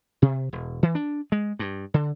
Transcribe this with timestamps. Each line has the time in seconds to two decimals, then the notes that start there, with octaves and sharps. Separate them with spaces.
0.22 C3
0.53 E1
0.83 E3
0.95 D4
1.32 G#3
1.59 G2
1.94 D3